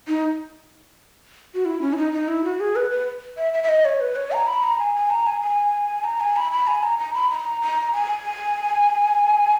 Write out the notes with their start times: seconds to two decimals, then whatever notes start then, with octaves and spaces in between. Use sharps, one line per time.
0.08 D#4
1.55 F#4
1.65 E4
1.81 C#4
1.93 E4
1.97 D#4
2.13 D#4
2.28 E4
2.44 F#4
2.60 G#4
2.76 B4
2.90 B4
3.37 E5
3.53 E5
3.64 E5
3.69 D#5
3.85 C#5
4.00 B4
4.16 C#5
4.32 A#5
4.47 B5
4.63 A#5
4.79 G#5
4.95 G#5
5.10 A#5
5.27 G#5
5.41 G#5
6.04 A#5
6.20 G#5
6.36 B5
6.52 B5
6.67 G#5
6.83 A#5
6.98 A#5
7.14 B5
7.30 A#5
7.62 A#5
7.93 G#5